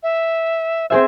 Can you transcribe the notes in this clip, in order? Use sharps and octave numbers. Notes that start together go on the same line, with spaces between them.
E5
C4 G#4 C5 E5